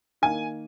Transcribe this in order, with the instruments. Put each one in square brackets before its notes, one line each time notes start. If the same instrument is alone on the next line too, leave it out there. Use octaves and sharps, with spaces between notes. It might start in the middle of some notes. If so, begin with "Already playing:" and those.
[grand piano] D#3 A#3 G#5